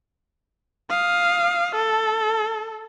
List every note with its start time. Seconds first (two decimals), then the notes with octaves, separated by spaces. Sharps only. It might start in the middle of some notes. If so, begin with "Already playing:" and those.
0.90 F5 D#6
1.75 A4